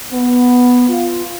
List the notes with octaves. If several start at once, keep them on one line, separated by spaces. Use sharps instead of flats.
B3
F4